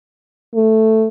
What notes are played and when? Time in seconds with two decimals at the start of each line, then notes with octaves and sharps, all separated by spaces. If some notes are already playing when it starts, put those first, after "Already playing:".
0.55 A3